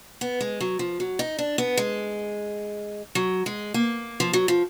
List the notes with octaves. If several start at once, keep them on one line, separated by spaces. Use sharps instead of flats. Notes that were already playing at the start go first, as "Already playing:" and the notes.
B3
G#3
F#3
F3
F#3
D#4
D4
B3
G#3
F#3
G#3
A#3
F3
F#3
F3